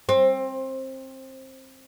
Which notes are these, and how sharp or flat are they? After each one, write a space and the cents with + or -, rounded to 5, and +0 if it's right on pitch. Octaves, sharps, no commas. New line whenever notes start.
C4 +20